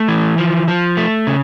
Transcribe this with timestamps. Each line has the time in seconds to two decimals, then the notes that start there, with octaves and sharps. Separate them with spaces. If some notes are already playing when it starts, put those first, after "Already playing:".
Already playing: A3
0.08 E3
0.38 F3
0.68 F3
0.97 A3
1.27 C#3